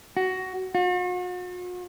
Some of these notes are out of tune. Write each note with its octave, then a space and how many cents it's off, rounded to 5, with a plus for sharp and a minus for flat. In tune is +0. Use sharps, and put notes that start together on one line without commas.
F#4 +15
F#4 -45